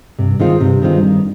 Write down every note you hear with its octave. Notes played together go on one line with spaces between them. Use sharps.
G2 C3
D#3 G#3 C4 F4
G2 C3
D#3 G#3 C4 F4
D#3